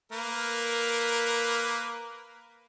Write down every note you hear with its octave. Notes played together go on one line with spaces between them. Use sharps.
A#3 A#4 B4